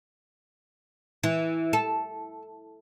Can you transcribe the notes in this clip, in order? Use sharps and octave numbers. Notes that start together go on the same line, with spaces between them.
E3
A4